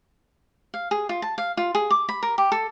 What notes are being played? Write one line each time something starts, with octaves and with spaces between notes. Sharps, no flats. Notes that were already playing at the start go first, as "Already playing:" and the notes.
F5
G#4
F4
A5
F5
F4
G#4
D6
B5
A#4
G4
A4